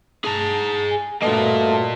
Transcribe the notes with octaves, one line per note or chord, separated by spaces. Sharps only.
G#4 A5 A#5
G#5
G2 A3 A#3 F4 F#4 B4 D#5 A5